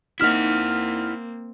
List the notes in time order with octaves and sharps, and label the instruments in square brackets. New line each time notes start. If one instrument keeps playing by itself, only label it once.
[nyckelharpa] A#3 C4 [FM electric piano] D#4 F6 B6 [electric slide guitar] E4 F#5